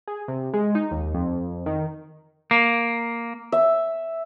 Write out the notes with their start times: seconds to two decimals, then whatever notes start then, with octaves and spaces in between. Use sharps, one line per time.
0.07 G#4
0.28 C3
0.54 G#3
0.75 D#4
0.91 D#2
1.14 F2
1.66 D#3
2.51 A#3
3.52 E5